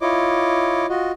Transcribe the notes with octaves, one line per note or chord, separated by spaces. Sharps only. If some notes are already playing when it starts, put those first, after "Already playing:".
E4 F4 C#5 D#5 D6
F4 F#4 D#5